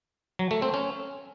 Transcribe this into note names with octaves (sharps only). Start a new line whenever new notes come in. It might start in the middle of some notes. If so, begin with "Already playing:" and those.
F#3
A3
C4
C#4